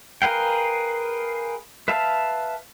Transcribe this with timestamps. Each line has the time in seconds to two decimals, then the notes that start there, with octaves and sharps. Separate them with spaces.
0.22 G#4 A#4 B4 F5 G5
1.88 B4 E5 F5 A5